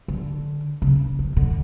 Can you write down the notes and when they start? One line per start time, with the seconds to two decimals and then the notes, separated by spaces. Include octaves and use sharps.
0.08 D3
0.82 C#3
1.19 C#3
1.37 D3